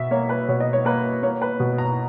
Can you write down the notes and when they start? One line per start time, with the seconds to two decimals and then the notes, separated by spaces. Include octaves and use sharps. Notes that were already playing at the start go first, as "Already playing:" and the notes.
Already playing: B2 E5
0.11 A#3 C#5
0.29 B4
0.48 B2 C#5
0.60 D#5
0.73 C#5
0.85 A#3 B4
1.22 A#3 C#5
1.42 B4
1.60 B2
1.78 A#5